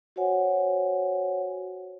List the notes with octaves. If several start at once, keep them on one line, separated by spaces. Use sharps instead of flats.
F#4 C5 C#5 F#5 G#5